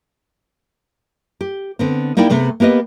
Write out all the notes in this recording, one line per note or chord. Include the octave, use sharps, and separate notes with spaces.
G4
D3 B3 C4
A#3 D#4 E4 G4 D5 G5
C3 A3 B3 G#4
A#3 B3 G4 B4 D#5